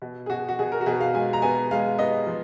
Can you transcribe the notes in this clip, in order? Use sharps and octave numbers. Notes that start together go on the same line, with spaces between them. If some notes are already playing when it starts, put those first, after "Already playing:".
B2
G#4
B2 F#4
F#4
B2 G#4
A#4
F#4
B2 G#4
F5
G#3 G#5
A#5
B3 G#5
G#3 F5
B3 D#5
F3